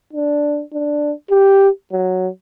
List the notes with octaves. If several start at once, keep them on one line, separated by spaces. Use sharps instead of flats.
D4
D4
G4
F#3